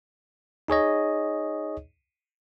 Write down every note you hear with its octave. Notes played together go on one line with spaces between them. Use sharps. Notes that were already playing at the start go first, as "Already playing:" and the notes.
D#4 G#4 C#5 D#5